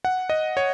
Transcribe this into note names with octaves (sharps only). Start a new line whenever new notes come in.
F#5
D#5
C#5